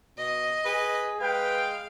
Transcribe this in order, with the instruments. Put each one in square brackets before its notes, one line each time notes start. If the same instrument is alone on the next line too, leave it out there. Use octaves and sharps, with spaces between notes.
[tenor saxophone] B2 [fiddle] D#5
[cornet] G#4 [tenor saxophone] B4
[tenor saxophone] G#3 [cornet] B4 [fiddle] F5 [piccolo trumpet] G5